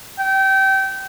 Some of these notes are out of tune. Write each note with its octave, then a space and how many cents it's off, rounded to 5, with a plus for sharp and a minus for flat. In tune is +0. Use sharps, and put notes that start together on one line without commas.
G5 -25